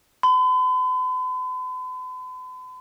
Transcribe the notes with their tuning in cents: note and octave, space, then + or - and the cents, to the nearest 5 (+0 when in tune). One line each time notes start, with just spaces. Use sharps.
B5 +45